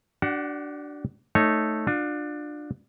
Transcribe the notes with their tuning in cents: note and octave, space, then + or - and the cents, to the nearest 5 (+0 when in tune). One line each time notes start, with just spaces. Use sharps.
D4 +0 F#4 +40 F#5 +0
A3 +0 D#4 +0 C#5 -15
D4 +20 F4 +35